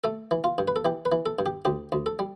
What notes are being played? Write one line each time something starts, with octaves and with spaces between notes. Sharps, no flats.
A3 A4
E3
F4
G2
B4
A4
E3 G4
B4
E3
A4
G2
G4
D2 G4
D2
A4
G3